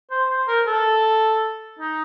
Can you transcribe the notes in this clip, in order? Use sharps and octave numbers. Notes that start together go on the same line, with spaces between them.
C5
C5
A#4
A4
D#4